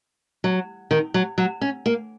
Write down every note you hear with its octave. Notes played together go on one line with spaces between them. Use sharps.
F#3
D#3
F#3
F#3
C#4
A#3